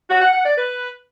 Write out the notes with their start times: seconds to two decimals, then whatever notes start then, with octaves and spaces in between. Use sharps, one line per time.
0.09 F#4
0.21 F#5
0.32 F#5
0.44 D5
0.56 B4